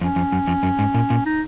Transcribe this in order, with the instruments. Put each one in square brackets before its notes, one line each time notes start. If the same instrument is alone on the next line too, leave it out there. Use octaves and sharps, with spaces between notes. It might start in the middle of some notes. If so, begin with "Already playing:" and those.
[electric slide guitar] F2 [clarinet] C#4
[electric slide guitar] F2
F#2
F2
F#2
G#2
A#2
A#2
[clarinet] D#4